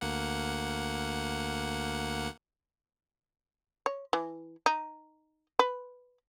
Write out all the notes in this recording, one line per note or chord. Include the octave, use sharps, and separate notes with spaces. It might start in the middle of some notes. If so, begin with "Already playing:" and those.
D2 A#3 F#5
C#5
E3
D#4
B4